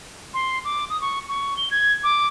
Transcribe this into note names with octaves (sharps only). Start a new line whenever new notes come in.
C6
D6
D#6
C#6
C#6
G7
G#6
D6